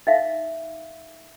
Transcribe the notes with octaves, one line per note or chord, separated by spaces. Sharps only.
D#4 E5 F5